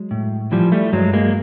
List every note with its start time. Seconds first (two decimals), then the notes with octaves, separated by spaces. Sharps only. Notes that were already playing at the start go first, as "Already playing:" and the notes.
Already playing: F#3 G#3
0.11 A2
0.52 E3 F3 G3
0.72 G3 A3
0.93 G2 F#3 G#3
1.13 G#3 A#3